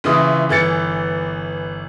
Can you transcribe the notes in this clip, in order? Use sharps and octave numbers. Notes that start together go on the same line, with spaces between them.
A#1 C#3 E3 E4 D#6
G1 E3 G#4 A6 C#7